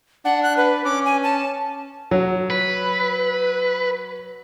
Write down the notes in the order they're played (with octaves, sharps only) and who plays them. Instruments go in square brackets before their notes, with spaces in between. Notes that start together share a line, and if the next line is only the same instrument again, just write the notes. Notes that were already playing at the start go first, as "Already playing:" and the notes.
[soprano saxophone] D4 [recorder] F#5
[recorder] F#6
B4
[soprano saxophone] C#4 [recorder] D6
[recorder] G#5
A5
[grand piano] F#3
[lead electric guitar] B4